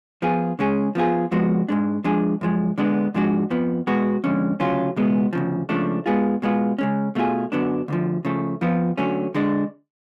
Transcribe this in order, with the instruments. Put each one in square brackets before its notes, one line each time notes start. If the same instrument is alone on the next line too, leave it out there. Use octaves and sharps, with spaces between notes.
[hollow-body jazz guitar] F3 B3 F4 G#4
C#3 G#3 C#4 G#4
F3 B3 F4 G#4
F2 F3 G#3 B3 F#4
G#2 G#3 D4
F3 G#3 D4 G#4
F#2 F3 G#3
D3 G#3 B3 D4
G#2 F3 G#3 D4 F#4
F2 F3 B3
B2 G#3 B3 F#4
F2 D3 G#3 C#4
D2 C#3 F#3 C#4 F4
C#2 B2 G#3 B3
D2 C#3 F3
C#2 C#3 F3 A3 D4
G#2 G#3 B3 F4 G#4
B2 G#3 B3 F4
C#3 G#3 C#4
B2 A3 F4 G#4
F#2 D3 F#3 B3 D4
D2 D3 F3
C#3 F3 A3
F2 F3 B3 F4
D3 F#3 A3 C#4
D3 G#3 D4